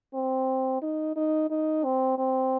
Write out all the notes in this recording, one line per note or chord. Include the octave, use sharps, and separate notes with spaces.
C4
D#4
D#4
D#4
C4
C4